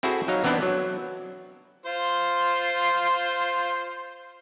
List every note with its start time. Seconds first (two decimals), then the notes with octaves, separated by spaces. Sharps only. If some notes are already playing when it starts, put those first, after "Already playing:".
0.03 C4 E4 F#4 G#4 A4
0.28 F#3 D#4 F5
0.44 E3 B3 C4 D4 E4
0.62 F#3
1.86 F4 C5 C6